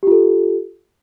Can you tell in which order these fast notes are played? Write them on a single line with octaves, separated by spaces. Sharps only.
G4 F4 A4